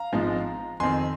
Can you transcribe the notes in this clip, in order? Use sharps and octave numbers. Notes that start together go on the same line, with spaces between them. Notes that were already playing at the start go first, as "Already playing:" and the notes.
Already playing: F5 A#5
G#1 G#2 F3 G#3 D#4
F2 D#3 C4 G#5 C6